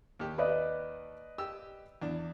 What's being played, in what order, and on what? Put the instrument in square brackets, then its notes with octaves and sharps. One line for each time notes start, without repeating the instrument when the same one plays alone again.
[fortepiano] D#2 G4
[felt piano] B4 D5 D#5
[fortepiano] G4 E6
E2 D4